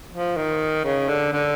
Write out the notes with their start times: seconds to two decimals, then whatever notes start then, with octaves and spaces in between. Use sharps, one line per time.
0.13 F3
0.37 D#3
0.85 C#3
1.08 D3
1.33 D3